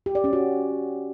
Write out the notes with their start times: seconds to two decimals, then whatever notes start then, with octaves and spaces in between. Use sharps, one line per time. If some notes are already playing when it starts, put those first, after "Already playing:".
0.06 G4
0.15 D5
0.24 C#4
0.33 F#4